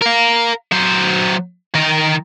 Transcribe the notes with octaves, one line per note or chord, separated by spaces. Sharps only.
A#4 F5
F#3 C5
D#3 A#4